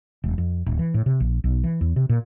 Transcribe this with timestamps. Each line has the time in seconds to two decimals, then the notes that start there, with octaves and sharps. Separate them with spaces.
0.24 E1
0.38 F2
0.66 D1
0.79 E3
0.94 A2
1.06 C3
1.20 A#1
1.44 B1
1.64 E3
1.81 E2
1.96 C3
2.09 A#2